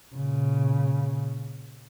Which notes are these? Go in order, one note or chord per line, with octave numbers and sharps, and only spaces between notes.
A#2 C#3